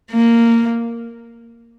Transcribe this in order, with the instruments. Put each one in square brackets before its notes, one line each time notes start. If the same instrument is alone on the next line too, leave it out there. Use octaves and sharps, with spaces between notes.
[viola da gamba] A#3